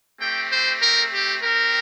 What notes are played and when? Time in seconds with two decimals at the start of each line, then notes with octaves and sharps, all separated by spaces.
0.20 A3 C4 G4 G5
0.52 C5
0.82 A#4
1.13 G4
1.43 C4 G4 A#4